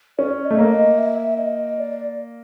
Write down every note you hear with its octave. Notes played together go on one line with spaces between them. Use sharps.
C#4 D5
D#5
A3
A#3
D#5
E5
D#5
D5